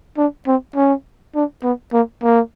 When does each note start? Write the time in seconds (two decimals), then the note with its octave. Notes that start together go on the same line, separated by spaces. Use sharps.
0.17 D4
0.47 C4
0.76 C#4
1.35 D4
1.63 B3
1.92 A#3
2.22 A#3